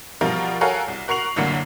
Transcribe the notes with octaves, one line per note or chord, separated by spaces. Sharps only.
B2 F3 G3 F4 A#4
F#4 A4 A#4 C#5 F5 G#5
C2
F#4 A#4 C#6 C7 F7 F#7
C2 F#2 A2 D3 A#3 C7